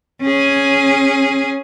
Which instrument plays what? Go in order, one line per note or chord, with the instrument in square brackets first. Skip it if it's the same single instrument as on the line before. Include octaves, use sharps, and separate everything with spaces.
[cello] C#4 G#4